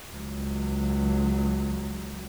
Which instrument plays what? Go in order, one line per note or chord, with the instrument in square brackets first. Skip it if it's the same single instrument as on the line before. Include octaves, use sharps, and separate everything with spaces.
[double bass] C#2 F#3